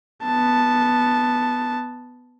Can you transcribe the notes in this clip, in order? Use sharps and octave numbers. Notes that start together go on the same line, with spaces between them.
B3 A5